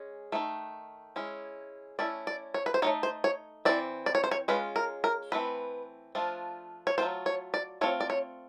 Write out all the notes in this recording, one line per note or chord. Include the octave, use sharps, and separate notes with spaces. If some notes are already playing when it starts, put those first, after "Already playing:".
Already playing: G#3 C#4
D#3 F#3 A3
G#3 C#4 E4
A3 C#4 E4 D5
D5
C#5
B4
C5
A3 C4 D#4 C#5
C5
C#5
E3 A3 C4 D5
D5
C#5
C5
C#5
G#3 C#4 F4 B4
A#4
A#4
E3 A3 C4 B4
F3 A3 D4 F4
C#5
F#3 A3 C4 F4 C5
C#5
D5
A3 C4 F4 C#5
D5
C#5